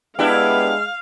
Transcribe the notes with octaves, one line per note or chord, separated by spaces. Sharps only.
G#3 B3 D4 E4 G4 F5